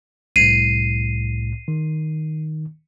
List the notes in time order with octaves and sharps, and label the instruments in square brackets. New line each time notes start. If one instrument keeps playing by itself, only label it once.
[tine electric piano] C2 A2 [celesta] C7 D#7
[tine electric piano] D#3